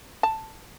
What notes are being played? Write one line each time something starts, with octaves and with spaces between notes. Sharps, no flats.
A5